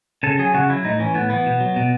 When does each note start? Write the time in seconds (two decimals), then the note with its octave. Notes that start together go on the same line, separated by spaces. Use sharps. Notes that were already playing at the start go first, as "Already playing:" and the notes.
0.23 C#3 A4
0.39 F#3 G#4
0.54 C#3 F#4
0.70 F#3 E4
0.85 A2 D#4
0.99 E3 C#4
1.14 A2 B3
1.30 E3 B3
1.46 B2
1.60 F#3
1.76 B2